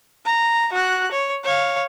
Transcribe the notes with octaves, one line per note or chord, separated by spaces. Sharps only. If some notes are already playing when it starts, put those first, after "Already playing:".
A#5
F#4 F#6
C#5
C#5 F5